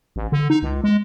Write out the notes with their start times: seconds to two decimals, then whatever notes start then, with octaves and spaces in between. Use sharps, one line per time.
0.16 A1
0.32 D3
0.50 D#4
0.63 C#2
0.84 G#3